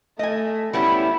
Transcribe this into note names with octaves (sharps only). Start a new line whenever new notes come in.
A3 D#5 G#5
G3 B3 C#4 E4